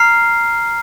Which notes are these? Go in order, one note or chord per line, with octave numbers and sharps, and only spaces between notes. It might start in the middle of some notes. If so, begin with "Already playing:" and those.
Already playing: A#5 F6 C7